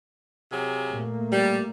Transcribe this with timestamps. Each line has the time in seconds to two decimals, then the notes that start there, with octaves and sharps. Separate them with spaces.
0.52 C3 F#3 G#4
0.90 A#2 A3 A#3
1.32 G3